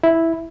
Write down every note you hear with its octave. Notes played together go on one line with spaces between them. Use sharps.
E4